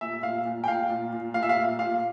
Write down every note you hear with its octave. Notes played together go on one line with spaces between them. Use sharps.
A#2 E5
A#2 F5
A#2
G5
A#2 F5
A#2
A#2
A#2 F5
E5
F5
A#2
A#2 F5